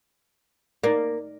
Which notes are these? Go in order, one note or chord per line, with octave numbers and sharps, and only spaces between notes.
A#3 D#4 A#4 D5